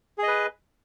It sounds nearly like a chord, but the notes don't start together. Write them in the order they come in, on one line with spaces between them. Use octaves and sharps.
G#4 D#5 B4